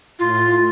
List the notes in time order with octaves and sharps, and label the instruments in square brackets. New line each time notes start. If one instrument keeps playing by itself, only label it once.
[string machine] A2 [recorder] F4